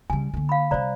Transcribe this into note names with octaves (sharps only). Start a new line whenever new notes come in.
C#3 G3 G#5
D3 A#3
F5 B5
C3 G3 C5 D5 A#5